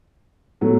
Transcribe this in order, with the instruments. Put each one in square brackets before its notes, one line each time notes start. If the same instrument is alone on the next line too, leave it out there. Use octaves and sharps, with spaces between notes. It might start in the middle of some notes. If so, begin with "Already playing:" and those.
[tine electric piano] A2 G#3 B3 E4 [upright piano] F#3 A3